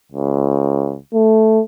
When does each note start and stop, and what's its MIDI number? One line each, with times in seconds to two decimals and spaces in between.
0.12 0.99 37
1.14 1.61 57